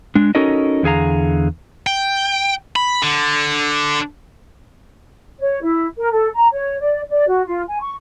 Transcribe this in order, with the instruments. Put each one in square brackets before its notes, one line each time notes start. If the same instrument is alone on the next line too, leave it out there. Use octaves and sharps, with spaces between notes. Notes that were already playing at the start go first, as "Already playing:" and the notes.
[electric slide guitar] G#3 D4
C#4 D#4 F#4 A4 A#4 D#5
E2 D3 G#4 F5 A#5
[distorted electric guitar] G5
B5
D3
[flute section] C#5
E4
A#4
A4
A#5
C#5
D5
D5
F#4
F4
G#5
C#6